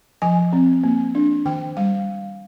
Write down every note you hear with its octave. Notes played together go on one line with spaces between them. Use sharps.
F3 G#5
C4
A#3
D4
D#3 G5
G3 F5